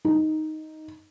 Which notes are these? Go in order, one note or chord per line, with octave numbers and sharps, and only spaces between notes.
D#4